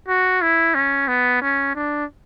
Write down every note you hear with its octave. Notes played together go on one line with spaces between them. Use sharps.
F#4
E4
C#4
B3
C#4
D4